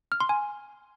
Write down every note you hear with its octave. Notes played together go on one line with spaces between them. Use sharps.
F6
C6
G#5